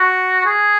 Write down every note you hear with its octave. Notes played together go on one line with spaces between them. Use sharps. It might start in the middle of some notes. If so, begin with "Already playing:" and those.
Already playing: F#4
G#4